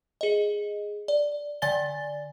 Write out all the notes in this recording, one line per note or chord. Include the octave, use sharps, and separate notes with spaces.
G#4 D#5
D5
D3 D5 G#5 A6 G7